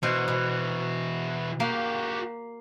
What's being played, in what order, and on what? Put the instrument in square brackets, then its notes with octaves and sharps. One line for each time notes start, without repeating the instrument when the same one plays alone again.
[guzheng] B2 C5 [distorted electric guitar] E3 F#4
[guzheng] B2
[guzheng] A#3 [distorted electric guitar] F#4 G4